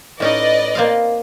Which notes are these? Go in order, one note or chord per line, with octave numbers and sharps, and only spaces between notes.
A2 C#4 D#4 B4 D5 D#5
A#3 C4 F5